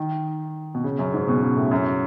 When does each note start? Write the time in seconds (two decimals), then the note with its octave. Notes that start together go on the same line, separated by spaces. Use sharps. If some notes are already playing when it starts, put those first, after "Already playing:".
Already playing: D#3
0.75 B2
0.84 C#3
0.99 F#2
1.14 G#2
1.28 B2
1.42 C#3
1.56 A2
1.71 F#2